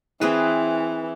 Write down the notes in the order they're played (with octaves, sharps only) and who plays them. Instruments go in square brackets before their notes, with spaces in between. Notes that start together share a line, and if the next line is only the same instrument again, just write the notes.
[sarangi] E3 [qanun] C4 G#4 B4